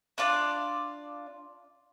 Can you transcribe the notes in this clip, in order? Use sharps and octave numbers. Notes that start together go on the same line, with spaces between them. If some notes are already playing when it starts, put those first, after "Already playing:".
D4 F4 D5